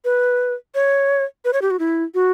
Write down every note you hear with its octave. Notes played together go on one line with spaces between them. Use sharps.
B4
C#5
B4
C#5
G4
F#4
E4
F#4